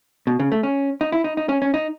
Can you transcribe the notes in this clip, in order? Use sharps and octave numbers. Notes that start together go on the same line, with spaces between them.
B2
C#3
A3
C#4
D#4
E4
D#4
D#4
C#4
C#4
D#4